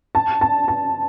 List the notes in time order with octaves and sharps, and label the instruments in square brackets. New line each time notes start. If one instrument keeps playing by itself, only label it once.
[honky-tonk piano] A5
A5
A5